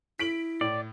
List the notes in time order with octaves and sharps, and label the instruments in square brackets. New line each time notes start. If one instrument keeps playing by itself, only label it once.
[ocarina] E4 [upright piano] B6 D7 F#7
[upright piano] A2 [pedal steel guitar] D5